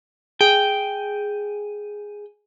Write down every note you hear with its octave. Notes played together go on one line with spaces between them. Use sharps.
G#4 G5